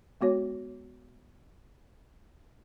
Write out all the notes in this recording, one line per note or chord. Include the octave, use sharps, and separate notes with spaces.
G#3 B3 F#4 C#5